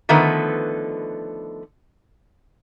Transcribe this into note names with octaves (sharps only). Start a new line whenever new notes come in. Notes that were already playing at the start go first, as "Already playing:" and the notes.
D3 D#3 F3 A3 B3 B4